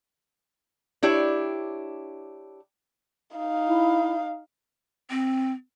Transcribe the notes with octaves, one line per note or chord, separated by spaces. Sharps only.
D4 E4 G4 C#5
D#4 F5
E4
C4